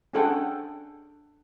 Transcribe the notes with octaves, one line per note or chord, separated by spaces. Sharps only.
C#4 D4 G#4 A4 F#5 G5